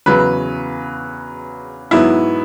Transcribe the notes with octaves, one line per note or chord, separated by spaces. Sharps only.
E2 C#3 F#3 B4
G#2 F#3 B3 E4